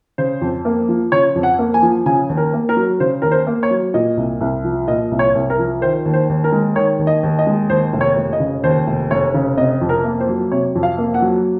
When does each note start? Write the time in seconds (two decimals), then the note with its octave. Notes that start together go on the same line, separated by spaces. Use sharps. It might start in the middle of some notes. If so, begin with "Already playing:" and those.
0.18 C#3 C5
0.41 F2
0.65 A#3
0.89 F3
1.12 C#3 C#5
1.36 F2
1.43 F#5
1.59 A#3
1.74 G#5
1.82 F3
2.06 C#3 G#5
2.29 D#2
2.37 A#4
2.53 A#3
2.69 A#4
2.77 F#3
3.00 C#3 C5
3.22 D#2 A#4
3.31 C5
3.47 A#3
3.63 C#5
3.71 F#3
3.94 A#2 D#5
4.17 C2
4.41 C2
4.64 F3
4.88 A#2 D#5
5.11 C2
5.19 C#5
5.35 C2
5.50 A#4
5.59 F3
5.81 D#3 C5
6.05 D#2
6.13 C5
6.29 D#2
6.44 A#4
6.52 G#3
6.76 D#3 C#5
6.99 D#2
7.07 D#5
7.23 D#2
7.39 D#5
7.47 G#3
7.70 D#2 C5
7.93 F1
8.01 C#5
8.17 F1
8.33 D#5
8.40 C#3
8.63 D#2 C5
8.87 F1
9.11 F1 C#5
9.34 C#3
9.57 C3 D#5
9.81 F2
9.89 A#4
10.04 A#3
10.20 C5
10.29 F#3
10.52 C3 C#5
10.75 F2
10.83 F5
10.98 A#3
11.14 F#5
11.22 F#3